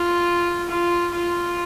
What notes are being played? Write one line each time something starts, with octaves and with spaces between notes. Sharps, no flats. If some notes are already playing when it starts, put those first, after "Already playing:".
Already playing: F4
F4
F4